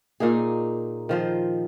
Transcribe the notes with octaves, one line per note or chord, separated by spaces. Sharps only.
A#2 A#3 D#4 G#4
D#3 F3 C5